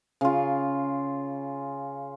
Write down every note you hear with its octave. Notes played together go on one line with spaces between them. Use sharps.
C#3 F4